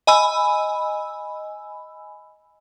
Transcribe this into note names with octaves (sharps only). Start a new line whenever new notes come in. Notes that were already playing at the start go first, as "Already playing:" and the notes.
D#5 G#5 B5 E6